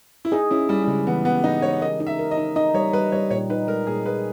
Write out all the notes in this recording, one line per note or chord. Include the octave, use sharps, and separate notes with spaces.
E4
D#4 G#4
C#4 E4
G3 G#4
G3
C#3 G#3
E3 B3
B3 G4
E3 D#4
G#3 C#5
A#4 D#5
D#4
E5
A#4
D#5
D#4
D#4 D#5
G3 C#5
G3 B4
G3 C#5
A#2 C#5
D#4 B4
G#3 A#4
A#2 G#4
G#4 B4